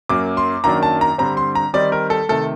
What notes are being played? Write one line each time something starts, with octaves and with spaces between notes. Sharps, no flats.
F#2 F#3 A#3 D6
C6
F#2 D#3 F#3 A#3 D4 A#5
A5
A#5
G2 D3 G3 C4 A#5
C6
A#5
D#3 G3 C4 D#4 D5
A#4
A4
C3 D#3 A3 A4